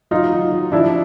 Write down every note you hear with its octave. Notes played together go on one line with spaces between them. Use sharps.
F#3 D#4 F4
F#3
F#3
F3 D4 E4